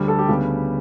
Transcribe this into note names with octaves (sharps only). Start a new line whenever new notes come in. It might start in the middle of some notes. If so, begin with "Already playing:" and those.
Already playing: D2 D3 G3
A4
G4
D2 C#3 G3 B3